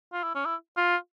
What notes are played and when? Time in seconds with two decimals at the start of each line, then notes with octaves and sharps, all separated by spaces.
0.13 F4
0.24 E4
0.35 C#4
0.46 E4
0.77 F4